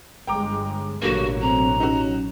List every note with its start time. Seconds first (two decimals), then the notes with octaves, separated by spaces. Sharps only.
0.27 G1 G#3 G5 A#5 D6
1.02 A1 G2 B2 D3 F#3 A#3 F#4
1.41 C4 A#5
1.80 C#4 D#4 F#4